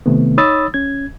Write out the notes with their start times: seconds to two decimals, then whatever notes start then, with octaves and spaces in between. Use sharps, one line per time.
0.06 C3 D#3 A3 B3
0.38 D#4 C#5 B5 D#6 E6 A6
0.74 C#4 G#6